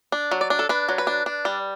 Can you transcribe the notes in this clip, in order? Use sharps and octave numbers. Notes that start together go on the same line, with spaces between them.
D4
F#3
D5
D4
A4
D4 B4
F#3
B4
D4
D4
G3